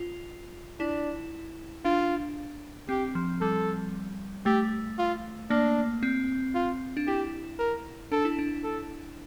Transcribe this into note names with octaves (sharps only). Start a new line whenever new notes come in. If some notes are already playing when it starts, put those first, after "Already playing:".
Already playing: F4
D4 E4
D4 F4
C4 G4
F3
G3 A4
A3 G4
F4
A#3 D4
C4
F4
D4
E4 G4
A#4
D4 A4
E4
D4
A4